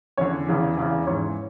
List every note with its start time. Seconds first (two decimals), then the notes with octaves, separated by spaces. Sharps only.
0.18 E2 D3 C#4 C#5
0.47 E2 C#3 E3
0.77 E2 C#3 E3 D4 D5
1.07 G#2 E3 C#4 C#5